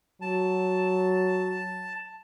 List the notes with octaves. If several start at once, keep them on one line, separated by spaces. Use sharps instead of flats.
F#3 A5